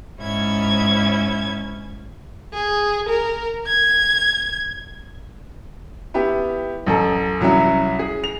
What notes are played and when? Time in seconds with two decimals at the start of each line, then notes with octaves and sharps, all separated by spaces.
0.21 G#2 C#4 E4 G#6
2.53 G#4
3.09 A#4
3.67 G#6
6.14 B3 E4 G4
6.86 A1 F#2 A4
7.40 C2 F#3 C#4 E4
7.99 G#4
8.24 F7